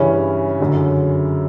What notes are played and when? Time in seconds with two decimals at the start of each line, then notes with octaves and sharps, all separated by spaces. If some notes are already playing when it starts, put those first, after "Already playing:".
Already playing: G2 C#3 E3 C#4
0.60 F#2 D3